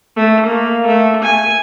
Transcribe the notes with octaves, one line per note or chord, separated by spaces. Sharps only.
A3
A#3
A3
G#5